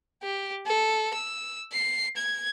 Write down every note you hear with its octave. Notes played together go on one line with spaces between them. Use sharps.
G4
A4
E6
C7
G#6